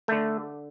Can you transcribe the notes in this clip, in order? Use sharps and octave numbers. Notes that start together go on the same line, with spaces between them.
D3 A3